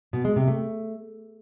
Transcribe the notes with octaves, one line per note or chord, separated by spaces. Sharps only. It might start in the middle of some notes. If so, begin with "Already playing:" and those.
B2
G#3
C3
A3